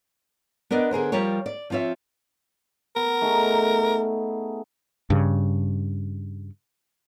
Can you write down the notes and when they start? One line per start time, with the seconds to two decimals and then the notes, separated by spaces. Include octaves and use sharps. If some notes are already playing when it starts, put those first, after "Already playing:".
0.71 B3 D4 A#4 D5 D#5
0.91 D3 G#4 A#4 C5
1.12 F3 G3 F4 G4 A#4 C#5
1.46 D5
1.70 F3 C4 F4 C#5 E5
2.96 B3 A#4
3.21 A3 D#4 G#4
5.10 G2 C#3